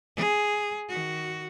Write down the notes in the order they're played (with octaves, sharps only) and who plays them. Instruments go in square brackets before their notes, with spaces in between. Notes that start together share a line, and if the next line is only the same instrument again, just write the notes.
[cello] G#4
D#3 F#4